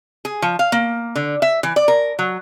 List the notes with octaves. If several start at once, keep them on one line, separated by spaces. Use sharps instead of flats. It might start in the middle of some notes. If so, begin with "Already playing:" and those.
G#4
F3
F5
A#3
D3
E5
E3
D5
A#4
F#3